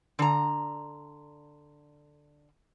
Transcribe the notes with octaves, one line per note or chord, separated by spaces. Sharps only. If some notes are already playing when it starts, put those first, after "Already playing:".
D3 A#5